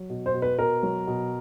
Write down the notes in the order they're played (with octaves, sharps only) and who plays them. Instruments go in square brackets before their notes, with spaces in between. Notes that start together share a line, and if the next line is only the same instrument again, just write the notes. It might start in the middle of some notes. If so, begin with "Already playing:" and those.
Already playing: [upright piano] F#3
B2
C5
B2
B4
B2 A#4
F#3
B2